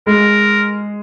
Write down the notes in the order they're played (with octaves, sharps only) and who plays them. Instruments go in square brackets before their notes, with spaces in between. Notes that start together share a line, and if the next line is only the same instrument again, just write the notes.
[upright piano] G#3 [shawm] A#4